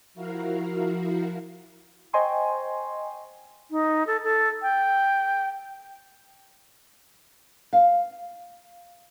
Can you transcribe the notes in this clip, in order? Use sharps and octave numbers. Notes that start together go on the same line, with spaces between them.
F3 E4 F#4 A#4 F5
C5 D#5 G5 G#5 C6 C#6
D#4
A4
A4
G5
F5